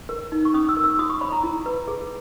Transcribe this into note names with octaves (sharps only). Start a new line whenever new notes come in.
A#4
D#4
C#6
C#4 D#6
E6
A#4
E6
F#4 D#6
C#6
C#5 B5
A#5
E4 A#5
B4
G#4